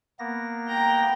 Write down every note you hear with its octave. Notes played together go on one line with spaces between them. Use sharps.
A#3 B3 A#6
G5 A#5